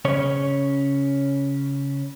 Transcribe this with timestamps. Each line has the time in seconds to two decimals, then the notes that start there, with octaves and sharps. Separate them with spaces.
0.05 C#3 C#4 C#5